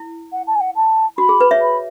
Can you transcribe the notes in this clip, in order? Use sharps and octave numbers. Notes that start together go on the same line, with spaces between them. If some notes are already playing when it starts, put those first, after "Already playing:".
Already playing: E4
F#5
A5
G#5
F#5
A5
F#4 B5
G#4
B4
C#5 E5
B5